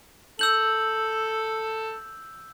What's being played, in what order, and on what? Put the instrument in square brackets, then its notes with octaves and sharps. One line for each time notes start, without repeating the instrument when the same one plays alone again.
[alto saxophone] A4 [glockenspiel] E6 G6 F#7